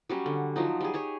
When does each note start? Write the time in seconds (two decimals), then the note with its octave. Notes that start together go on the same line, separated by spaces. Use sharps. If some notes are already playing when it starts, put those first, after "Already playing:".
0.09 F#3 G3 C#4
0.26 D3
0.56 F3 F#3 D#4
0.81 G3 G#4
0.94 G4 G#4 C#5